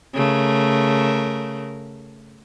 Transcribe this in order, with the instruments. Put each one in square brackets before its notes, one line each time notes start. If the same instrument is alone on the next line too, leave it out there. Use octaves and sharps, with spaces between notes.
[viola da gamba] C#3 A3 A#4